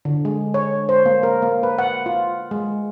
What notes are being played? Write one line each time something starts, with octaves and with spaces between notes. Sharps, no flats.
D3
G#3
C#5
C5
A#3
A#4
A#3
B4
F#5
F4
G#3